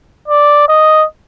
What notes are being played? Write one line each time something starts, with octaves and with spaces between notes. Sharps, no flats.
D5
D#5